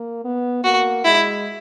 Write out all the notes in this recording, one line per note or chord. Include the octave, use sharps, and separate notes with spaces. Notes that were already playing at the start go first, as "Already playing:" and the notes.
Already playing: A#3
B3
A#3 F#4
G#3 E4